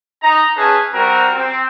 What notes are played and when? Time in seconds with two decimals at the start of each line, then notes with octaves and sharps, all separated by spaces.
0.22 D#4 A#5
0.56 C#4 G#4 B4 E5 A5
0.93 G3 C4 F#4 A#4
1.35 C4